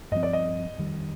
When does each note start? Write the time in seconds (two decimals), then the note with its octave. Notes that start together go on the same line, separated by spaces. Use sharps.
0.12 G2 F3 C4 D#5
0.23 D5
0.33 D#5
0.78 F2 D#3 G3